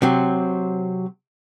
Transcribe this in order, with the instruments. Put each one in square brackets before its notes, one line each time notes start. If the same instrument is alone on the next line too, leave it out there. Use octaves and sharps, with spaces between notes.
[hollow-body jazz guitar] C3 F#3 C4